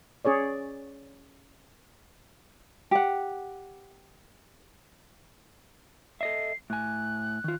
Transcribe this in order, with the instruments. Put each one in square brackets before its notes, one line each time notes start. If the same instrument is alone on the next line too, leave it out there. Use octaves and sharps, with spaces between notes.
[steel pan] C#4 G#4 C#5 D5
[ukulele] G4 F#5
[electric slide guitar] A4 D#5 E5 [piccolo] C7
[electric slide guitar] A2 G#5 [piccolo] F#6
[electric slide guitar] D#3 F4